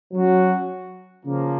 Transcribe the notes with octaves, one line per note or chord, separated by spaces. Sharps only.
F#3 C#4 F#4
C#3 F3 A#3